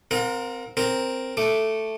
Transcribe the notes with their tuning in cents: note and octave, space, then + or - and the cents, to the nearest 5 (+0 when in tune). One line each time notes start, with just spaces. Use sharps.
C4 -15 A#4 +0 F5 +45
C4 +0 A#4 +0
A3 +0 D6 +0